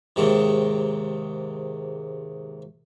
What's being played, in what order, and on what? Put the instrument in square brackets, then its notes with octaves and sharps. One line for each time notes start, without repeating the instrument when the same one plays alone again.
[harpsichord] D#2 G#2 C3 D#3